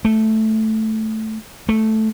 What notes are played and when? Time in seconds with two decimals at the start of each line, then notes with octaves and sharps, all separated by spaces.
0.05 A3
1.69 A3